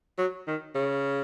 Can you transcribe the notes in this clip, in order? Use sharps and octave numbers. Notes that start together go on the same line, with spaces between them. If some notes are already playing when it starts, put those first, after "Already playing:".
F#3
D#3
C#3